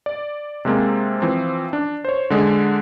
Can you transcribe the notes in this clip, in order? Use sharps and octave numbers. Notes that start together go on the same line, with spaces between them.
D5
C3 G#3 A#3 C4
E3 F3 C4
D4
C5 C#5
D3 G#3 D4